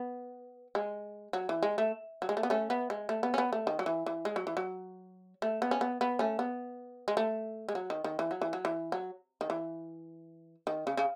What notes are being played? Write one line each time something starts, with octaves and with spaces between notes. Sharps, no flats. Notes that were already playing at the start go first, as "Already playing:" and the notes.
Already playing: B3
G#3
F#3
E3
G#3
A3
F#3
G#3
A3
B3
A3 C#4
B3
G#3
A3
B3
C#4
B3
A3
D#3
F#3
E3
E3
G#3
F#3
E3
F#3
A3
B3
C#4
B3
B3
A3 C#4
B3
G#3
A3
G#3
F#3
D#3
D#3
E3
F#3
E3
F#3
E3
F#3
D#3
E3
D#3
C#3
C#3